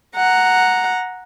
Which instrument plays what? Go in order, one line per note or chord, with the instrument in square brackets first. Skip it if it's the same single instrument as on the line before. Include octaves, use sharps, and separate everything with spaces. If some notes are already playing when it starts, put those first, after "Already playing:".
[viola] F#5 A#5